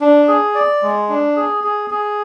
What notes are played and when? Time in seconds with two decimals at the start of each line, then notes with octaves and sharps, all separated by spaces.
0.01 D4
0.28 G#4
0.55 D5
0.83 G#3
1.09 D4
1.37 G#4
1.64 G#4
1.90 G#4